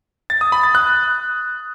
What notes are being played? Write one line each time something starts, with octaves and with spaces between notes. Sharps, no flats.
A6
D#6
B5
A6
F#6